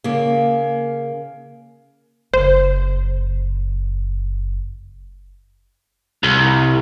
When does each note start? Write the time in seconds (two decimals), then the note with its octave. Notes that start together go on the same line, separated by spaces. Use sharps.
0.04 C#3 A#3
2.34 F#1 C5
6.23 C2